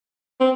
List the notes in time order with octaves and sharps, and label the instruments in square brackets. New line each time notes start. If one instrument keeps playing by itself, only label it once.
[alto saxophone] C4